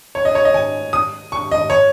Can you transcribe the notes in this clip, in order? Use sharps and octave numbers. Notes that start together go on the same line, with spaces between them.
C#5
D#5
C#5
D#5
G#5
D#6
C#6
D#5
C#5